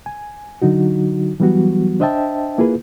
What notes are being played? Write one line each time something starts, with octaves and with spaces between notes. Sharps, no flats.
G#5
D3 F#3 D#4 F#4
E3 F#3 G3 B3 F#4
D4 C5 D#5 E5 G5 A5
A#3 E4 F4 G#4 B4